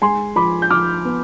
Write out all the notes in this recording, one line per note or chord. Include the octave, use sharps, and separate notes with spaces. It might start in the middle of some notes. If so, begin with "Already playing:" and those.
G#3 G#5 C6
F3 B5 D6
G6
F3 D6 F6
B3